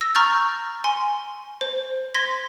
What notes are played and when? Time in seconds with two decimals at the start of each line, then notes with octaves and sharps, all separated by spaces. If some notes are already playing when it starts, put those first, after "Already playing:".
0.01 E6 A#6
0.15 A#5 C#6 F6 G6 A6
0.84 G#5 C6
1.61 C5
2.14 C6 G#6 A#6 B6